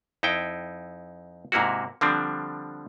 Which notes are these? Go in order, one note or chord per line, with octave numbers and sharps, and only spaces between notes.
F2 D#4 E4 G5
G#2 C3 A#3 E4 F#4
D3 F3 G3 C4 D4